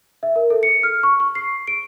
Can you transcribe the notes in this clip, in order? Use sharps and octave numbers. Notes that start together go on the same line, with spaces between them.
E5
A#4
A4
C#7
F6
C#6
C#6
C7
D7